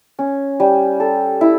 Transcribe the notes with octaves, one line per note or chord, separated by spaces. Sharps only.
C#4
G3
A4
E4